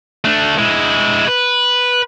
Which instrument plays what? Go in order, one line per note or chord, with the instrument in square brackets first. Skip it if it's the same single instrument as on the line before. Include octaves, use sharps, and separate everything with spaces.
[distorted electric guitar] A3 D4
G#3 E4
B4